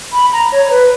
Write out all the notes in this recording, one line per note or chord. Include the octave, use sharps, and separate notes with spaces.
B5
A#5
C#5
C#5
B4